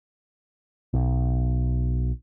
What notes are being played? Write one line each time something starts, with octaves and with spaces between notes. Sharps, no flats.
B1